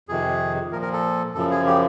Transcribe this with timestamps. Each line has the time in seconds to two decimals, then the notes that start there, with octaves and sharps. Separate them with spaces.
0.08 F2 C3 D#3 G#4
0.72 A#2 F3 A#4
0.82 A#4
0.93 A4
1.35 F#2 C#3 F3 A4
1.51 G#4
1.67 G4